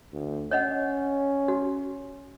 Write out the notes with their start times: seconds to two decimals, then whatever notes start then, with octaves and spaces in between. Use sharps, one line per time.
0.13 D2
0.51 C#4 C#5 D#5 F#5
1.48 F#4